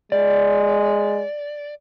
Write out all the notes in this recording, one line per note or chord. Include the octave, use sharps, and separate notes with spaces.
G#3 D5